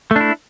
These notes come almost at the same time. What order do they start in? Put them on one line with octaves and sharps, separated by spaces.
A3 D4 E4